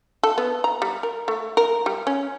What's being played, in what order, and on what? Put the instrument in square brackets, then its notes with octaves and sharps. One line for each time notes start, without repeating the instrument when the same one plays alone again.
[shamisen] A4
B3
A#5
G3
A#4
A3
A#4
G3
C#4